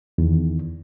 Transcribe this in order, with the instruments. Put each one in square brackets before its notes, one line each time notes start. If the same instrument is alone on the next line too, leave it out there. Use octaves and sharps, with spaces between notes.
[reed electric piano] E2 D#3